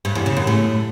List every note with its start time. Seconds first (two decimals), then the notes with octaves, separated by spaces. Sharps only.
0.05 G2
0.15 E2
0.26 C#3
0.37 F#2
0.47 A2